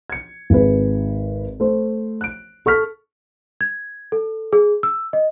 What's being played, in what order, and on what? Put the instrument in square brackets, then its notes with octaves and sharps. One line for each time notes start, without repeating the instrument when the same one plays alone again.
[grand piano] G#6 C#7
G#1 G#4 B4
A3 C5
F#6 D7
A4 C#6 F6 B6
[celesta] G#6
A4
G#4
E6
D#5